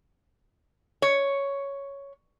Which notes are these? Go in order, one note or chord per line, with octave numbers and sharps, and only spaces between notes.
C#5